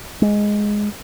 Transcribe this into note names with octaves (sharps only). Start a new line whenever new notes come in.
G#3